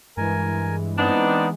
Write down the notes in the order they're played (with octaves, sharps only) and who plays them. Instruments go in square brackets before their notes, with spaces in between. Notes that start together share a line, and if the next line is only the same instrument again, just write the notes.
[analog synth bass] G2 [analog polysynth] E3 G#3 [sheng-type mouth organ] A#4 G#5
[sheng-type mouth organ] B3 [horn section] C4 D4 D#4